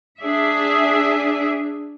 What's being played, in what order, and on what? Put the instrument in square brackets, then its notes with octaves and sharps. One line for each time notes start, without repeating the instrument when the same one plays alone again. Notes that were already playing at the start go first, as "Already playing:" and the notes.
[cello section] D4 G#4 E5